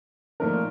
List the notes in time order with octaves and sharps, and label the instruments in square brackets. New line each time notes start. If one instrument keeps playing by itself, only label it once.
[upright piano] A#2 F3 A3 D#4 A#4